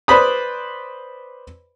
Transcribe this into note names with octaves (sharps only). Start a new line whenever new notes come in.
B4 C5 D5 B5 D#6